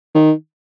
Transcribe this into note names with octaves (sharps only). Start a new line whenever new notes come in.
D#3